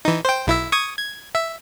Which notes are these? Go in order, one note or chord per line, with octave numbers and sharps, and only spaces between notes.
E3 D#4
C5 G5
B1 E4 E5
C#6 D#6 G#6
G#6
E5